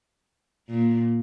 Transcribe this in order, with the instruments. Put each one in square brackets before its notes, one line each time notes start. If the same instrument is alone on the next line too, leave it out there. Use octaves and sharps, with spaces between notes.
[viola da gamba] A#2